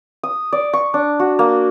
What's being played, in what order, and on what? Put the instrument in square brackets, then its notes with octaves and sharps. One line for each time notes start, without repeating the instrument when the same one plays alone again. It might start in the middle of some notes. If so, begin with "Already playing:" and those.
[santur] D#6
D5
C#6
D4
F#4
A#3